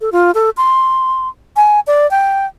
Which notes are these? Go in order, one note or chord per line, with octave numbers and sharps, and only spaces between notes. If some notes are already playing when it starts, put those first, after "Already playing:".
A4
F4
A4
C6
G#5
D5
G5